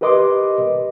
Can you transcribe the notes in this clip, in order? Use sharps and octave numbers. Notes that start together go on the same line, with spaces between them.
G4 A#4 B4 D#5 C6 D6